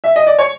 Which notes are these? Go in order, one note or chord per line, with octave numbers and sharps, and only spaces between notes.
E5
D#5
D5
C#5